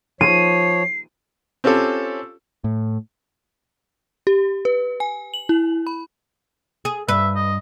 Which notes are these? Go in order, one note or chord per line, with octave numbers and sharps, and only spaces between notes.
F3 C#5 C7 D#7
C4 C#4 F4 G4 A4
A2
G4
B4
G#5
F#7
E4
B5
G#4
G2 B4 E5
D#5